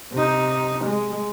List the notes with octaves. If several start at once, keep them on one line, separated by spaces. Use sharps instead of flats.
C3 D#4
G#3